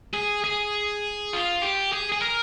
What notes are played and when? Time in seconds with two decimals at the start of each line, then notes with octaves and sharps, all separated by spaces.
0.14 G#4
0.44 G#4
1.33 F4
1.62 G4
1.93 G#4
2.12 G#4
2.22 A#4